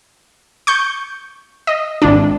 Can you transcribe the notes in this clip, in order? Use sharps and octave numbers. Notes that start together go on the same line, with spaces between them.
C#6 G6
D#5
G#1 D4